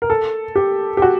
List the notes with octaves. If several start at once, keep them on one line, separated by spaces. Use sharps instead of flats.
A#4
A4
G4
G4
F#4